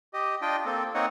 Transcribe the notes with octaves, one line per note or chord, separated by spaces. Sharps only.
G4 D#5
D4 F4 D#5 G5
A#3 C4 A4
A#3 C4 D#4 C#5 D#5 F#5